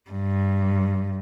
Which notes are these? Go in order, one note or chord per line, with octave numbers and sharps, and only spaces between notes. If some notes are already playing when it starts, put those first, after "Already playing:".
G2